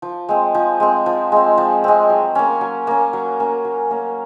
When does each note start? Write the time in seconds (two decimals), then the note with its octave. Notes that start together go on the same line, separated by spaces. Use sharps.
0.02 F3
0.29 G#3 C4
0.55 F3
0.80 G#3 C4
1.06 F3
1.32 G#3 C4
1.58 F3
1.84 G#3 C4
2.10 F#3
2.35 A#3 C#4
2.61 F#3
2.87 A#3 C#4
3.13 F#3
3.40 A#3 C#4
3.65 F#3
3.91 A#3 C#4